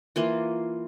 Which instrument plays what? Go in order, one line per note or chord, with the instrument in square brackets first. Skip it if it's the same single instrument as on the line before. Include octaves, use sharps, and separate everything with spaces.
[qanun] E3 A#3 F4